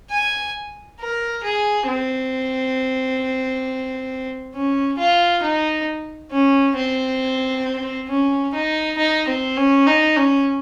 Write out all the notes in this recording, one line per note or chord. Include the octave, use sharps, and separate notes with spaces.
G#5
A#4
G#4
C4
C#4
F4
D#4
C#4
C4
C#4
D#4
D#4
C4
C#4
D#4
C#4